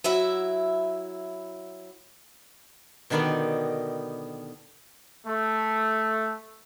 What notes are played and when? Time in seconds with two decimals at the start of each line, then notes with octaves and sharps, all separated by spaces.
0.04 F#3 E4 E5
3.10 B2 D3 D#3 B3 D#4 G4
5.27 A3